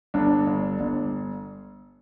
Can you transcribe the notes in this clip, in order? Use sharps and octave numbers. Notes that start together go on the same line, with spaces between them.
G1 D4
G1
G1